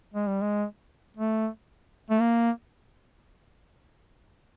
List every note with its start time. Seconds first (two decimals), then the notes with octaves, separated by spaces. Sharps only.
0.14 G#3
0.28 G3
0.41 G#3
1.17 A3
2.10 A3
2.20 A#3